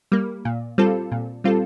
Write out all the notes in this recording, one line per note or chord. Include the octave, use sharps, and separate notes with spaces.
G3 A#3
A#2
G3 C4 F4 A4
A#2
G3 C4 F4 A4